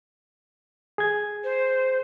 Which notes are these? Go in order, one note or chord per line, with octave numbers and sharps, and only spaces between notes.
G#4 G#6
C5